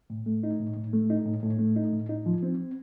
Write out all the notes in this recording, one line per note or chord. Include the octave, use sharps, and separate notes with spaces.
A2
A3
D#4
A2
A2
A3
D#4
A2
A2
A3
D#4
A2
D#4
F3
C4